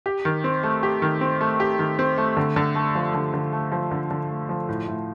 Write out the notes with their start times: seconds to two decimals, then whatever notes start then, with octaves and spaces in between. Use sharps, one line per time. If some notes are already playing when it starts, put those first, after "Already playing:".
0.06 G4
0.25 D#3
0.44 C4
0.63 A3
0.83 G4
1.02 D#3
1.21 C4
1.41 A3
1.60 G4
1.79 D#3
1.99 C4
2.18 A3
2.37 D3
2.56 D3
2.75 A3
2.95 F3
3.14 D3
3.34 D3
3.52 A3
3.72 F3
3.91 D3
4.11 D3
4.30 A3
4.49 F3
4.69 A2
4.88 A2